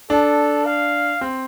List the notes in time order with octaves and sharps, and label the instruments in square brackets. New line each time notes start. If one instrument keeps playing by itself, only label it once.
[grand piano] D4 [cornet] A4
[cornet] F5
[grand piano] C4